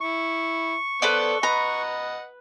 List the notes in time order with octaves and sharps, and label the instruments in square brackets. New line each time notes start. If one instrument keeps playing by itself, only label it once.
[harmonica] E4 [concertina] C#6
[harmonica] B3 C5 [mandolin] A4 B4 D5
[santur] B4 [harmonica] D#5 F#5 [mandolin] A#5